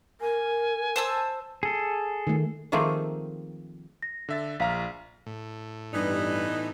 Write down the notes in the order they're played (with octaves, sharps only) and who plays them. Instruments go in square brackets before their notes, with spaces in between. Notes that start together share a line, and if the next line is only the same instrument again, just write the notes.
[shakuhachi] A#4 [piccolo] G#5
[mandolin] C5 A5 E6
[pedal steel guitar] G#4 A4
[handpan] D#3 A3
[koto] D#3 F3 A3 A#3 C4 G#4
[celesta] A#6
[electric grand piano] D3 E5 A6
[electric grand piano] A#1 A#5 F6 [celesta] F5 B6
[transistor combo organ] A2
[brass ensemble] G2 [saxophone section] E3 B3 D#4 [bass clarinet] G3